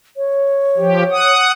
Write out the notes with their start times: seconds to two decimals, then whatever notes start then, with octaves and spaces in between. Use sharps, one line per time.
0.17 C#5
0.77 F3 G4
1.11 F#5 D#6